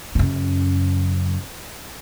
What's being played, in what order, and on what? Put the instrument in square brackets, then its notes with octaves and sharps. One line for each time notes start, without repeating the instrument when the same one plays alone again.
[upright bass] F#2 C#3